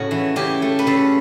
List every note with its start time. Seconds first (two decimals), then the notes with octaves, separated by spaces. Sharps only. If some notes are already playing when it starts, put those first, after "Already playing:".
Already playing: A2 C#3 F#4
0.11 E3
0.36 C#3 G4
0.62 A3
0.79 B4
0.87 C#3 A4